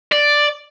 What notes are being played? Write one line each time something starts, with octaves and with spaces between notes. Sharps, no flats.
D5